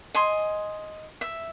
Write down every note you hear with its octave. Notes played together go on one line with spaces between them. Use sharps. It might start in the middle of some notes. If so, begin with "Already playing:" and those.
D#5 G#5 C6
E5